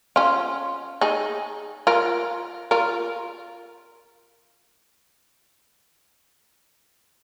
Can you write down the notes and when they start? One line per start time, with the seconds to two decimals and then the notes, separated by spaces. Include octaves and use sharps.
0.16 C#4 F4
1.01 D#4 G#4
1.87 F4 A#4
2.71 F4 A#4